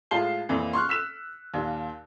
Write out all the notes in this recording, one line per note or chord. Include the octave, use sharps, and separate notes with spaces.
A2 G#3 F4 A5 C7 G7
F2 A#2 E3
C6 C#6 F6 F#6
E6 B6 E7
D#2 A#2